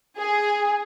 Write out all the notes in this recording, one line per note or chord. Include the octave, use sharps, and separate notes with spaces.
G#4